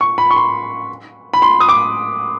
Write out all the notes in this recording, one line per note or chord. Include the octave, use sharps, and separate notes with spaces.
C#6
B5
C#6
C6
B5
C6
D#6
D6